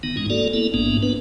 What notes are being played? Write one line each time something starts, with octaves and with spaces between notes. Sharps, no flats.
D#3 B3 D#4
G#2 G#3 C#4 D#4
A#3 F#4 A4 D5
A#3 B3 E4 A4
A1 G#2 A#3 B3 D4
B3 D4 B4